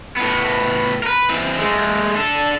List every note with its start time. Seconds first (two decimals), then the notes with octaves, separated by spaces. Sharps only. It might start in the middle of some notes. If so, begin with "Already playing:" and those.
0.17 A2 B3
1.03 A#4 B4
1.30 E3 C4
1.59 G#3 A3
2.16 D4 A4